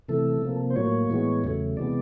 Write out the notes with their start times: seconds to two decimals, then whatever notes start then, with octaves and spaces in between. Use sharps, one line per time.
0.08 C3 E3 A3 A4
0.42 C3 F3 A#3
0.70 C5
0.76 A2 F#3 A#3 C#5
1.10 A2 E3 G#3 B3
1.44 E2 C#3 F#3 A3
1.77 C3 E3 G#3 B3 D5